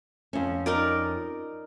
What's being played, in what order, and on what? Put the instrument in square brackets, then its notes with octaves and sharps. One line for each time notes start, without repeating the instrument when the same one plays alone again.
[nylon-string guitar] F2 C#4
[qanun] D#4 A#4 D5